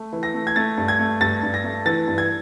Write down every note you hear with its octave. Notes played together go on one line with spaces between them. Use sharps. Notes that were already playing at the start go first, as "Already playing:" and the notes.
Already playing: A3
E3
A#6
A3
G#6
A3 A6
G2
G#6
A3
G2 A6
G2
A#6
A3
E3 A6
G2
G#6